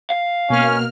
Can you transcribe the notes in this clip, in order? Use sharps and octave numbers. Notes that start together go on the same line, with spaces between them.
F5
B2 A#3 C#4 F6